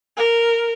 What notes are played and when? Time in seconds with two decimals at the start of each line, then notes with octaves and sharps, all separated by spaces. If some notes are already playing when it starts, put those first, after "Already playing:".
0.17 A#4